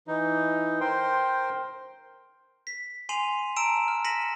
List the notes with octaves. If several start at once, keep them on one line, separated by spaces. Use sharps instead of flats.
E3 D#4
A#4 C5 G5 C6
B6
G#5 C6 C7 D#7 F7 F#7
A5 A#5 E6 D7 E7
F6
A#6 B6 C#7 D#7 E7 F#7